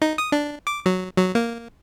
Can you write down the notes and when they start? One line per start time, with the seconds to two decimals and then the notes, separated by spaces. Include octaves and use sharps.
0.02 D#4
0.18 D#6
0.32 D4
0.67 D6
0.86 F#3
1.18 F#3
1.35 A#3